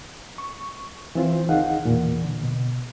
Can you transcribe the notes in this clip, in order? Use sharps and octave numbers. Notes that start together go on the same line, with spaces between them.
C#6
E3 C4 F4 C5
C#2 D#3 D#4 G#4 F5 F#5
E2 A#2 E3
D3
B2